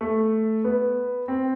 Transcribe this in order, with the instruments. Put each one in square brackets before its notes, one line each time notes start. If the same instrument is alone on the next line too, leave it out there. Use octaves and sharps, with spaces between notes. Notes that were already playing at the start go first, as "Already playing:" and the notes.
[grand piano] A3
B3
C4